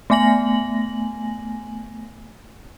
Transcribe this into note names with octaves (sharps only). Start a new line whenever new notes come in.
A3 B3 G#5 A#6 F#7